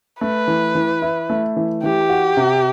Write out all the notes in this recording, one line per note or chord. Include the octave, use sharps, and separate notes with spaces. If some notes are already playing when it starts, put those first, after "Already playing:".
A3 B4
E3
E3
E4
A3
E3
E3 G4
F#4
C3